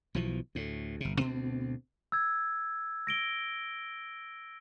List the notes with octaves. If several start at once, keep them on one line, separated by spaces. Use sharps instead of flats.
B1 B2 E3 F3
D2 A2
G1 C3
D2 B2 B3 C4
E6 G#6
A#6 D7 G7